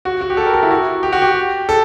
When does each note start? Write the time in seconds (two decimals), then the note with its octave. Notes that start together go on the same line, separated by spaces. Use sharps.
0.05 F#4
0.21 F#4
0.30 G4
0.37 A4
0.46 A#4
0.53 A4
0.63 E4
0.71 F#4
1.03 G4
1.12 F#4
1.22 G4
1.69 A4